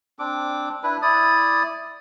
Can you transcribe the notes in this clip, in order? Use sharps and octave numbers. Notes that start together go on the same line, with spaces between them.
C4 D4 D6
D4 E4 B4
E4 D5 D#6